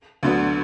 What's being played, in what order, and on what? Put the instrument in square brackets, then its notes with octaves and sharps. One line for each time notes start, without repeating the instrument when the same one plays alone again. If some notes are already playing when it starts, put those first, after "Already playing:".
[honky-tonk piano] D2 D3 F#3 B3